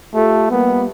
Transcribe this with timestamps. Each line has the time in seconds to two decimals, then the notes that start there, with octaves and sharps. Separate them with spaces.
0.14 A3 F4 G4 A4
0.51 G3 A#3 B3